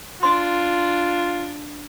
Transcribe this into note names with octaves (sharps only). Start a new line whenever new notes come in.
D4 F4 C6